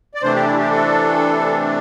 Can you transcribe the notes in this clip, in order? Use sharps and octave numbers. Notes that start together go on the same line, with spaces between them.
D5
C3 E3 A3 D4 C5
G4
E4
G4
A4